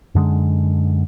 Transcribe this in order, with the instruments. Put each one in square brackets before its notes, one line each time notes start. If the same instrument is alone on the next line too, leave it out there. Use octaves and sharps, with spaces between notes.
[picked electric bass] F#2 D3 G#3